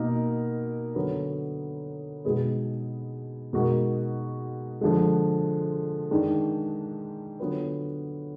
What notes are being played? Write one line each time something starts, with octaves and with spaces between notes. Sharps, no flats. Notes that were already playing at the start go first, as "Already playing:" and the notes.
Already playing: B2 A#3 D#4 A#4
D3 F#3 B3
B2 G#3 D#4 G#4 B4
B2 G#3 D#4 F#4 A#4
D3 F3 G#3
G#2 D#3 G#3 D4
D3 F#3 B3 F4 B4